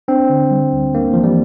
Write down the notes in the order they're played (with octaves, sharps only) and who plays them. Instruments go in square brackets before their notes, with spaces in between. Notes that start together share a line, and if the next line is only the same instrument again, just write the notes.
[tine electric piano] C4 [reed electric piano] D4
[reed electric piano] D3
G3
D2
[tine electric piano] A#3 [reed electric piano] D4
[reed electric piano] E3 [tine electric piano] F3
[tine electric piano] G3